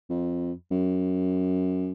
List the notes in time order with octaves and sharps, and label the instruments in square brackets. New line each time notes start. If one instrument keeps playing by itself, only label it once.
[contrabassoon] F2
F#2